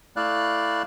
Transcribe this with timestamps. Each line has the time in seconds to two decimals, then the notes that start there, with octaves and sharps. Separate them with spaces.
0.16 A3 E4 D5 F5 F#6